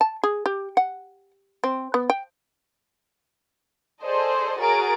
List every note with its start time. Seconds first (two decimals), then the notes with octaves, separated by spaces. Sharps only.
0.01 A5
0.23 G#4
0.46 G4
0.77 F#5
1.64 C4
1.94 B3
2.10 G5
4.03 G#4 A4 C5 D5 D#5
4.60 F#4 G#4 A#4 C#5 A6 D7